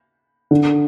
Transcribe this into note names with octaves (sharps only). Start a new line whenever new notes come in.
D3